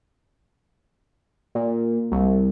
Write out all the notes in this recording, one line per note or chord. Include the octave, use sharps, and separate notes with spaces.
A#2
C2